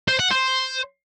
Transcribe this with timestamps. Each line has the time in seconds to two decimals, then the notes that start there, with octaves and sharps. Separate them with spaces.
0.08 C5
0.19 F#5
0.31 C5